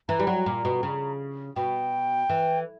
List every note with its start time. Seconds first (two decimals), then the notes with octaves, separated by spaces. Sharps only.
0.09 E3 A#5
0.19 G3
0.27 F#3
0.46 A#2
0.65 B2
0.83 C#3
1.56 B2 G5
2.30 E3